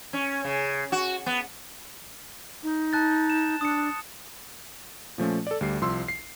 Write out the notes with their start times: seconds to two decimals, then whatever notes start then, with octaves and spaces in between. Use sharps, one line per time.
0.13 C#4
0.45 C#3
0.92 F#4
1.26 B3
2.63 D#4
2.93 A5 F#6 A6
3.29 E7
3.61 D4 D#6 C#7
5.18 A#2 F3 A3 C#4
5.47 A4 D5
5.61 D2 G3 C7
5.81 C2 F3 C6 E6
6.08 C7